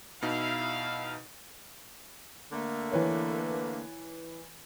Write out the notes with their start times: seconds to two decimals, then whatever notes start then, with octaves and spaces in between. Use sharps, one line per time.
0.22 B2 D#4 E4 F5
2.52 D3 A3 A#3
2.92 E3 B4 C#5